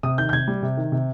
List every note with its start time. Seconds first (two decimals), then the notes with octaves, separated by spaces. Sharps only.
0.03 C3 D#6
0.18 D#3 G6
0.29 G6
0.33 C3 G#6
0.48 G3
0.63 C3
0.77 D#3
0.92 C3